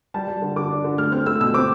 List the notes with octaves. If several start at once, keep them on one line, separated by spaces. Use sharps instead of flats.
G3 A5
G3
D3
D3 D6
D4
D3
A3 F6
C4 F6
A3 E6
B2 E6
C4 D6